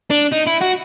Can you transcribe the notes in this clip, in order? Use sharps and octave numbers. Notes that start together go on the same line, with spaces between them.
D4
D#4
E4
F#4